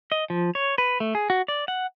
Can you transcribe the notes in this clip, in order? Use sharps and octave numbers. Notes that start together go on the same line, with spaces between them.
D#5
F3
C#5
B4
A3
G#4
F#4
D5
F#5